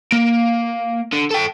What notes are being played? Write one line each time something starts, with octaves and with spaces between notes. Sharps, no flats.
A#3
D3
A4 G5